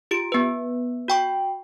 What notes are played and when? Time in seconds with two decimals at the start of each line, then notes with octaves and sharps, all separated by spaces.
0.11 F4 G4 D7
0.32 B3 B4
1.08 F#4 G5 C#6